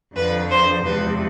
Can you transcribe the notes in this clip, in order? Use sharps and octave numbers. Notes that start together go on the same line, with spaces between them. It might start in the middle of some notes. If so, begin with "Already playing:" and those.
F2 D3 F3 B4
C5
E2 C3 F3 G#3 B4